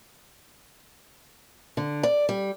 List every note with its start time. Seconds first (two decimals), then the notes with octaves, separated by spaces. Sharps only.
1.77 D3
2.03 D5
2.29 G3